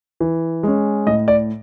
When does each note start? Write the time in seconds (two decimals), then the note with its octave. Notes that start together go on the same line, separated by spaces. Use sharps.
0.20 E3
0.63 G#3 C#4
1.06 A2 D#5
1.28 D5